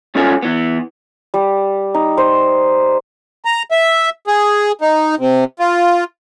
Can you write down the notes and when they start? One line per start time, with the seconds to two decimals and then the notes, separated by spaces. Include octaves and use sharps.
0.15 G2 C#4 F4 A4 C#5 G#5
0.42 E3 B3
1.34 G3
1.94 D#4
2.17 C5
3.45 A#5
3.71 E5
4.27 G#4
4.81 D#4
5.19 C3
5.59 F4